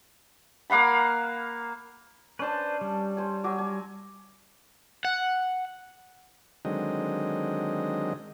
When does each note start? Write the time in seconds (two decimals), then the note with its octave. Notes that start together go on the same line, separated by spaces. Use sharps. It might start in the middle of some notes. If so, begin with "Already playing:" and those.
0.70 A#3 F5 F#5 B5
2.39 C#4 D4 B4 C5 A5
2.81 G3
3.17 C5 G#5
3.44 F#3 G#5 D6
3.58 G#5
5.05 F#5
6.65 D3 D#3 F#3 G#3 C4 D#5